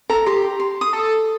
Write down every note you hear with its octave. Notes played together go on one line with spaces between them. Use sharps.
A4 A#5
G4 C6
C6
D#6
A4